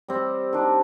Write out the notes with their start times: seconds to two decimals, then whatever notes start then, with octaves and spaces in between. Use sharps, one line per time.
0.08 G3 C4 G4
0.53 D#3 G3 D4